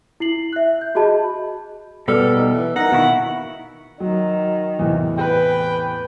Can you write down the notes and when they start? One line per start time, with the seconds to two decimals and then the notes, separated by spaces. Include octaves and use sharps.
0.20 E4 C7 F#7
0.53 E5 F#6
0.81 G6
0.95 F#4 G#4 D#5 A5 B5
2.08 B2 G3 A4 B4 D5 F6
2.36 D#4
2.52 E3
2.76 D#4 A#4 F#5 A#5
2.92 B2 D#3 E4 F5 C#6
4.00 D#3 F#3
4.79 E2 A2 C3
5.18 B4 G5